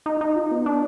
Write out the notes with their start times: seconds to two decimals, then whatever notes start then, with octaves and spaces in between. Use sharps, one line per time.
0.06 D#4
0.21 D#4
0.36 F4
0.51 B3
0.66 D4